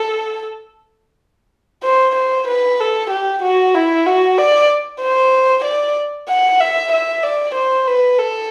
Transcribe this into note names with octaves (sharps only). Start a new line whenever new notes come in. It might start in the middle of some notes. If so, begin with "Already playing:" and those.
Already playing: A4
C5
C5
B4
A4
G4
F#4
E4
F#4
D5
C5
D5
F#5
E5
E5
D5
C5
B4
A4